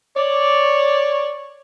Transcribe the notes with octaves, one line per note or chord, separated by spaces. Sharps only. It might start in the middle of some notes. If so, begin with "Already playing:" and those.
C#5 D5